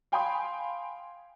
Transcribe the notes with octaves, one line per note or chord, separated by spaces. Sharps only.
F5 G5 G#5 B5 C6 D#6